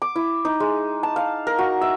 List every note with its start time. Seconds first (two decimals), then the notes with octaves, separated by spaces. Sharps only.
0.02 D6
0.16 E4
0.45 D#4
0.60 G#3
1.03 A5
1.16 F5
1.47 A#4
1.58 F#4
1.81 E5